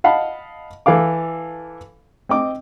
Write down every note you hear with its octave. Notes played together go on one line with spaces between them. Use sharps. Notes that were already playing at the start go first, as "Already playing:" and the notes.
D#5 F5 F#5 A5 B5
E3 A4 F5 D6
C4 D#5 D6